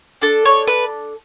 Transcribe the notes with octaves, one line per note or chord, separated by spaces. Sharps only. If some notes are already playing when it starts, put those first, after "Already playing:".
D4 A4
C#5
B4